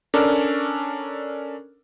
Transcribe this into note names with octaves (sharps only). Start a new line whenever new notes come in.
C#4 D4 A4 A#4 D5